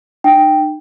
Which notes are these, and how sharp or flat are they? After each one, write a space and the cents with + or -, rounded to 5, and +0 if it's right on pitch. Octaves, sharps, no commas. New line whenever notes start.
D#4 -40 G5 +0